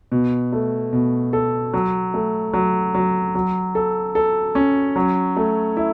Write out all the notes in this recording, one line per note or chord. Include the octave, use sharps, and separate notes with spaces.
B2
A3
B2
A4
F#3
A3
F#3
F#3
F#3
A4
A4
C#4
F#3
A3
E4